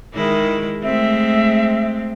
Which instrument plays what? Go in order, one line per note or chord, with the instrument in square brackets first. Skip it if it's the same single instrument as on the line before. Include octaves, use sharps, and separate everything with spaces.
[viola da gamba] D#3 G#3 E4
[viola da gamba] G#3 A3 C4 [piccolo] E5